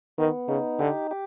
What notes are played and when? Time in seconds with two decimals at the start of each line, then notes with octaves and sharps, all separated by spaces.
0.18 D#3 B3
0.48 C#3 D#4
0.79 D3 G4
1.11 G4